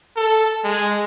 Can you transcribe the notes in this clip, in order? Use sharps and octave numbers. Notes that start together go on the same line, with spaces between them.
A4
G#3